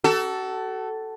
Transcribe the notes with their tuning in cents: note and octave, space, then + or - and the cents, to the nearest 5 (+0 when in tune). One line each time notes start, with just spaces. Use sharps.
F#4 +35 A4 +0